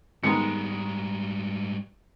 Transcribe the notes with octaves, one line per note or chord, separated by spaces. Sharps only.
G#2 D#3 G3 G#3 B3 A#5 C#7